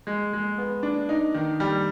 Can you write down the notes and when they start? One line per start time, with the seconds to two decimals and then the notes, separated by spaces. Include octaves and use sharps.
0.07 G#3
0.33 G#3
0.58 B3
0.83 D4
1.09 D#4
1.34 D#3
1.60 G3